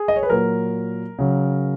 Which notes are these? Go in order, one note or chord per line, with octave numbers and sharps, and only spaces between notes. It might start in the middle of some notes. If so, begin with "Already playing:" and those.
Already playing: G#4
D#5
C#5
B4
A#2 F#3 A#4
C#3 F#3